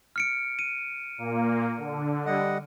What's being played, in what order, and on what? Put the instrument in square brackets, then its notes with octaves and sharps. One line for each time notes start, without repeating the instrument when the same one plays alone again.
[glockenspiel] F6 C#7 D7
D#7
[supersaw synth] A#2 A#3
D3
[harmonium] G3 D#5 F#5